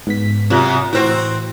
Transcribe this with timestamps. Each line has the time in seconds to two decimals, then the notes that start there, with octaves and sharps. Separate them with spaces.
0.07 G#2 B3 B6
0.50 F#2 C3 F4 F#6
0.93 A2 E3 C4 F#4